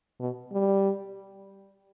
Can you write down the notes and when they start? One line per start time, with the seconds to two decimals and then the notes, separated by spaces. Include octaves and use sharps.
0.20 B2
0.52 G3